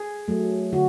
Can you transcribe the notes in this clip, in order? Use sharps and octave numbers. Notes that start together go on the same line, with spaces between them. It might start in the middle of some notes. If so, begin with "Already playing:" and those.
Already playing: G#4
F#3 A3
D3 F#4